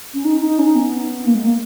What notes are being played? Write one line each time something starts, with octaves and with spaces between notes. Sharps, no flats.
C#4
D#4
D#4
C#4
B3
A#3
G#3
A#3